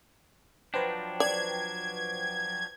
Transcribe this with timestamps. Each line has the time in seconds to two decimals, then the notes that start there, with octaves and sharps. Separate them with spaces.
0.74 F3 F#3 D4 B4 C5 G5
1.20 D5 G#6